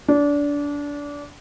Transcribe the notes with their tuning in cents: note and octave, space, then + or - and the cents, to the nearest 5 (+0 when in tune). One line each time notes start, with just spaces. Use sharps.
D4 -25